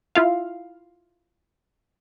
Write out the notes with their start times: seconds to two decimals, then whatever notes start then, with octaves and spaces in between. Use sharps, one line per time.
0.15 E4 F4 F5